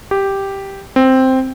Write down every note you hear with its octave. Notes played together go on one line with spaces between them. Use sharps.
G4
C4